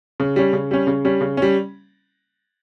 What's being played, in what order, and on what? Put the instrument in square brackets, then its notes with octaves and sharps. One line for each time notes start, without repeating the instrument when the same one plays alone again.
[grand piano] C#3
G3 C#4
C#3
G3 C#4
C#3
G3 C#4
C#3
G3 C#4